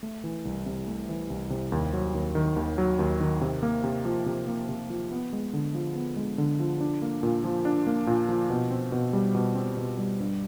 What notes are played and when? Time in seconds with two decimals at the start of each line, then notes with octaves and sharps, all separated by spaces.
0.03 A3
0.24 E3
0.45 C2
0.66 C3
0.87 A3
1.09 E3
1.30 C2
1.50 C3
1.72 D#2
1.93 F#3
2.15 D#2
2.35 D#3
2.56 D#2
2.78 F#3
2.99 D#2
3.20 D#3
3.41 C3
3.63 A#3
3.84 C3
4.05 F3
4.26 C3
4.47 A#3
4.69 C3
4.90 F3
5.11 B3
5.33 G#3
5.53 D3
5.75 F3
5.95 B3
6.16 G#3
6.38 D3
6.59 F3
6.81 D4
7.02 A#3
7.23 A#2
7.44 F3
7.65 D4
7.87 A#3
8.07 A#2
8.29 F3
8.50 B2
8.71 C4
8.92 B2
9.13 G3
9.35 B2
9.55 C4
9.77 B2
9.98 G3
10.20 G2